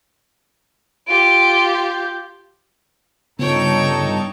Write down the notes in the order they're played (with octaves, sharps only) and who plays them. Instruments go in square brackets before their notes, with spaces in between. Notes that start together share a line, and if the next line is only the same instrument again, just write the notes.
[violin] F4 G4 [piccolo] D7
[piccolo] G6
[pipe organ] G2 D#4 A4 [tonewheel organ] C#3 [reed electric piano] B3 F4 [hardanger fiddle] C#5 G5